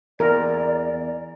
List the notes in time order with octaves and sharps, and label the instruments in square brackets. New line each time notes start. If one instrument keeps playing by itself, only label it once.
[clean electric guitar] E2 [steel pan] A#4 [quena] D5